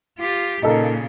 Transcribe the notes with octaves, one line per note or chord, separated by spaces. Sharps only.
F4 G4
A#2 C#3 D#4 A4 A#4